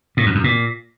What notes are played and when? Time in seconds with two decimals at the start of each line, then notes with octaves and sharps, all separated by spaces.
0.17 A2
0.26 F2
0.35 F#2
0.44 A#2